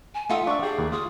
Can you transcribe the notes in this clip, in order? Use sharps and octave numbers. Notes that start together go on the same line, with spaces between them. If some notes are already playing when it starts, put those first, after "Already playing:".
G#5
A3 D#4 F4 E5 F#5
D4 D5 E5 C#6
G4 G#4
D#2
F4 D#6